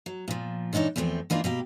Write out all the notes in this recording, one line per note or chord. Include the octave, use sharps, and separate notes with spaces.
F#3
A#2 F3
A#2 E3 D4 D#4 C#5
E2 A2 F3 A3 C4
E3 A#3 D4 D#4 F4
B2 A#3 G4